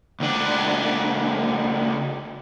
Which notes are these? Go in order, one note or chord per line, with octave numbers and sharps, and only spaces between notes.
C#2 D4